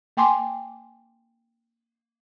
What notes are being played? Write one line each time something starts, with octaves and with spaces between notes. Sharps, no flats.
A#3 G5 G#5 C6 D6